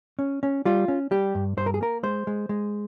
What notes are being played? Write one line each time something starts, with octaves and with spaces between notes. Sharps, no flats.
C#4
C#4
G3 F4
C#4
G3 G4
G2
G2 C5
A#4
G#4
A#3 A#4
G#3 C5
G#3
G#3